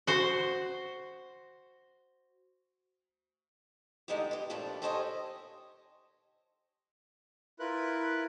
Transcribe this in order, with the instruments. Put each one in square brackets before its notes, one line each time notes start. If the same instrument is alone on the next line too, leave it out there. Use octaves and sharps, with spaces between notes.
[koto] F#4 C5
[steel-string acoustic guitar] D3 G#3 A3 D#4 E4 G4
G4 B4
G2 A#2 F3 G3 A3 D4
G4 A4 C5 C#5 D#5 G#5
[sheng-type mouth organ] E4 F4 A#4 B4 F#6